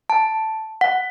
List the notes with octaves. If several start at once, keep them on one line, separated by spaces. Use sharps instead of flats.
A5
F#5